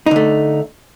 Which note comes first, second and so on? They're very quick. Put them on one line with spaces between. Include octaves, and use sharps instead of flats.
D#4 D3 A3